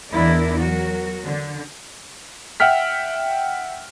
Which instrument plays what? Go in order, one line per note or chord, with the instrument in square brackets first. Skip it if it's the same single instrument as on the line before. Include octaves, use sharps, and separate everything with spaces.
[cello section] E2 D4 E4 A#4 D5 D#5
F#3 F#4 A#4
D3
[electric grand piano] E5 F#5 G5 F6 B6